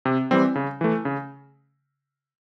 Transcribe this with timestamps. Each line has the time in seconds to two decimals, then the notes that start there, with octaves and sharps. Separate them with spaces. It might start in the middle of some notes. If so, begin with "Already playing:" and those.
0.05 C3
0.31 E3 G3 C4
0.55 C#3
0.81 E3 A3
1.05 C#3